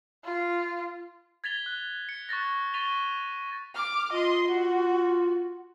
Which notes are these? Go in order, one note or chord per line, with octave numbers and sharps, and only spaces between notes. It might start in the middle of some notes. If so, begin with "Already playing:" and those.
F4
G#6 A6 B6 F7 G7
F#6
C#7
C#6 F#6 A6 A#6
C#6 A6 B6 D#7 F7 G7
D6 F6
F4 D#5 C6
F#4